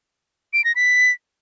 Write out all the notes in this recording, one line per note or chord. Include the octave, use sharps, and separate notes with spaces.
D7
A#6
B6